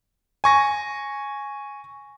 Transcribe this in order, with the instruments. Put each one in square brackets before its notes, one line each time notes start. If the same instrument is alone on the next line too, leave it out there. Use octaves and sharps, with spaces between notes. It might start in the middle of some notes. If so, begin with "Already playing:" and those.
[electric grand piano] G#5 C#6 A#6